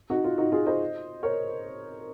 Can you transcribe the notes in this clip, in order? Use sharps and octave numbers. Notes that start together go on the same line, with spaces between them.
D#4 F#4
F4
D#4 F#4
F4 G#4
C5 D#5
A#4 C#5